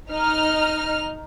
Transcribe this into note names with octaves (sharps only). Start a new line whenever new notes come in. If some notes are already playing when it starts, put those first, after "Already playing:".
D#4 F6